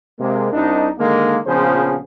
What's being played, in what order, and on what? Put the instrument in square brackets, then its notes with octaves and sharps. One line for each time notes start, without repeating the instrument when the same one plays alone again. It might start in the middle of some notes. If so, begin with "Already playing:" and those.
[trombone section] C3 G#3 A#3
C2 D4 D#4
D3 D#3 G#3 A#3
A#1 C#3 F3 B3 G#4 C5